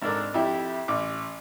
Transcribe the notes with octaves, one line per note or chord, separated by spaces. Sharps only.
G#1 G#2 D4 A4 A#4 D5
F2 E4 G4
A1 D6